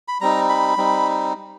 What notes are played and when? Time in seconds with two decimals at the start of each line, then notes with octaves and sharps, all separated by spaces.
0.08 B5
0.21 G3 C4 D#4 A#5
0.49 B5
0.77 G3 C4 D#4